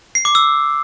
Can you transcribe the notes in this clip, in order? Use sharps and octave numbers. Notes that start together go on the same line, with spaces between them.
C7
D6
E6